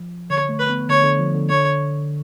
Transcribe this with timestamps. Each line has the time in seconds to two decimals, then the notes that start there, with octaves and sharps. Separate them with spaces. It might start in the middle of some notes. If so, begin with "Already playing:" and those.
Already playing: F3
0.30 D3 C#5
0.49 A3
0.59 B4
0.69 B3
0.89 D3 C#5
1.04 D3
1.19 F3
1.35 D3
1.49 D3 C#5